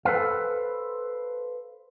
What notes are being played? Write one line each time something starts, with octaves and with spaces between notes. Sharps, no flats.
A4 B4 C5 F5